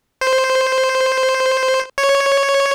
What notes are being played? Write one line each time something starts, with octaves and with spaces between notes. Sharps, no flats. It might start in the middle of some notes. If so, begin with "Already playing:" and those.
C5
C#5